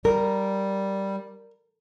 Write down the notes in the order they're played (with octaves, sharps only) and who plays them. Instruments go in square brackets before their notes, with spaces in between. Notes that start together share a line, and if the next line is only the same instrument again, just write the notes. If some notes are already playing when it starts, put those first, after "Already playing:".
[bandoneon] G3 [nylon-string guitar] A#4